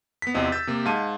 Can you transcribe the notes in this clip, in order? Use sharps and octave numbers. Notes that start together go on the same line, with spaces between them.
B3 B6
E2 C3 C4 F4 D#5
E6 G6 A6
C3 A#3
G#2 F5 A5 D#7